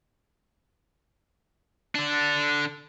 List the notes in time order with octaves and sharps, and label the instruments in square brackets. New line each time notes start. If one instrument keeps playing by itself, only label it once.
[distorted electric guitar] D3 D4